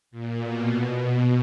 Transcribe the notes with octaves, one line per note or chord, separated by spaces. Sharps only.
A#2
B2
B2